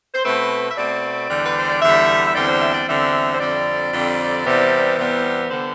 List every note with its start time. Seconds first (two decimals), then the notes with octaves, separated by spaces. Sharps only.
0.15 C5
0.25 B2 A3 C4 B4
0.71 E5
0.77 B2 A3 C4 D5
1.30 E2 D3 G3
1.45 B4
1.58 C5
1.69 D5
1.82 E2 D3 G3 E5
2.26 E5
2.35 E2 D3 G3 C4 D5
2.49 C5
2.61 E5
2.74 D5
2.88 E2 D3 G3 C4 E5
3.35 C5
3.39 F2 D3 G3 C4 D5
3.93 F2 D3 G3 C4
4.45 E2 C3 G3 B3
4.98 E2 C3 G3 B3
5.50 D3 G3 B3 C5